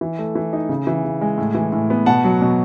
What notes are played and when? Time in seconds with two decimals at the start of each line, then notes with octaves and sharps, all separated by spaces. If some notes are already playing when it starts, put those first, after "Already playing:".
0.01 E3
0.19 A3
0.35 E3
0.53 D#4
0.69 C#3
0.87 E3
1.04 C#3
1.21 G#3
1.38 A2
1.55 E3
1.72 A2
1.90 B3
2.06 B2 F#5 A5
2.24 F#3
2.42 B2